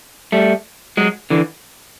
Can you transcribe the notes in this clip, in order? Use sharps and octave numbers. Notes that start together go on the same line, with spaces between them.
G3 A3
F#3 G#3
D3 E3